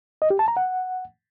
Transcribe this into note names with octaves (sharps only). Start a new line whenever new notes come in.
D#5
G4
A5
A#5
F#5